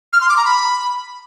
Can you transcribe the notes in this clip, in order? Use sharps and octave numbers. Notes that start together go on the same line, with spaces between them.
F6
C6
D6
A#5
B5